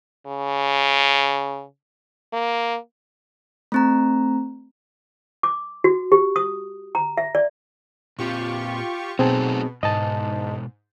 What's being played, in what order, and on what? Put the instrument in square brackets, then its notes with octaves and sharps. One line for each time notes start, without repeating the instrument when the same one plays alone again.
[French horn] C#3
A#3
[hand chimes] A3 C4 A#5
[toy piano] D6
F#4
G4
D#6
A#5
E5
D5
[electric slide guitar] A#2 C4 [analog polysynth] F4 G4 C#6
[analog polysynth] B2 [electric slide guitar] F#3 A3 D#4 [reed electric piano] C4 G#4 A5
[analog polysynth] G#2 [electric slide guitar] B2 G#3 [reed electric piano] D#5 A5